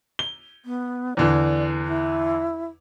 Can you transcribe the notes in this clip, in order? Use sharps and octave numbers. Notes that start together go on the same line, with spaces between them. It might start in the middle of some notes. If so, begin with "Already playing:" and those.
G7
B3
E2 D3 E3 D5
E4